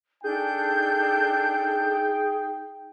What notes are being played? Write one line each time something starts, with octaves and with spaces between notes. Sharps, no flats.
D4 D#4 G#4 A4 G5 G6